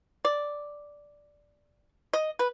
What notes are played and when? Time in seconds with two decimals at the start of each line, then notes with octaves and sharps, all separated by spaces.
0.25 D5
2.13 D#5
2.39 B4